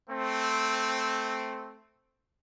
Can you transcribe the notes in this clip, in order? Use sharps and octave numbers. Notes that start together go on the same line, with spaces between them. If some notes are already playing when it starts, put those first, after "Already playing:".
A3 C4